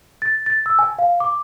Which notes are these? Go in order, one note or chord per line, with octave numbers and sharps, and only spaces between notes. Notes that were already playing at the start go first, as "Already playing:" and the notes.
A6
A6
E6
G#5
F5
D6